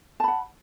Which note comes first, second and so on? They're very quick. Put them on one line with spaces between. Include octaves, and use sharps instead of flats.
A5 B5 F#5